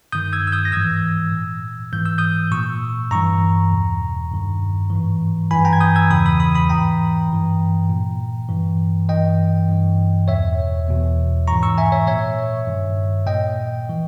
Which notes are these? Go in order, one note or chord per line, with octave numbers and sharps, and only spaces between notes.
G2 D#3 D#6 G6
E6 G#6
E6
D#6 G6
A#6
G#2 E3 E6 G#6
A#2
G#2 E3 G6
E6
D#6 G6
A#2 C#6 E6
G2 E3 A#5 C#6
E2 B2
G2 D#3
G#2 E3
G2 E3 G#5 B5
G5 A#5
G#6
D#6 G6
E6 G#6
E2 C#3 E3 B5 D#6
B5 D#6
B5 D#6
B5 D#6
G#2 E3 G5 A#5
G2 E3
A#2
G2 E3
G2 E3 D#5 G5
G2 E3
E2 B2 C#5 E5
E2 B2
G#2 E3 A#5 C#6
C#6 E6
E5 G#5
C#5 E5
A#2 C#5 E5
G2 D#3
A#2 D#5 G5
E3